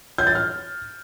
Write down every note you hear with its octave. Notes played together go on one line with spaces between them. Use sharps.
G6
A6
F6